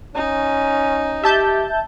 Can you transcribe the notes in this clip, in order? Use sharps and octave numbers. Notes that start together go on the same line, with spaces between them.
C#4 D#4
G4 E5 A5 G6